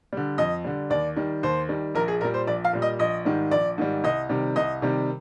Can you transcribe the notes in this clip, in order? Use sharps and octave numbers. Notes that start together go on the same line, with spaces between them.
D3 G3
F2 D#5
D3 G3
D#2 D5
D#3 G3
D#2 C5
D#3 G3
A#1 A#4
G#4
A#2 G3 A#4
C5
A#1 D5
F5
A#2 G3
D#5
A#1 D#5
G#2 D#3 G3
A#1 D5
G#2 D#3 G3
C2 D#5
C3 D#3 G3
C2 D#5
C3 D#3 G3